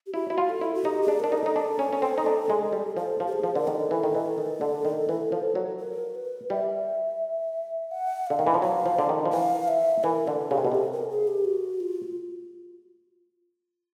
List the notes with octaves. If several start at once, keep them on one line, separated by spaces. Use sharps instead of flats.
G4
E4 F#4
E4
F4
A4
E4
F#4
D#4 G4
G#4
D4
D4 A#4
D#4
A4
D#4
D4
C#4
C#4
C4
D#4
D4
G#3
G3
F3 A4
F3
G4
G#4
F3
D3 A#4
D#3 A4
E3
D#3
E3
D#3
D3
D#3
E3
F3
F#3
A#4
B4
G3 E5
F#5
D3 F5
D#3
E3
F3
F#3 F5
F3
D3
D#3
F3
E3 F5
E5
E3 A#4
D3 A4
C#3 G4
C3
B2
C3 A4
A#4
G#4
G4
F#4
F4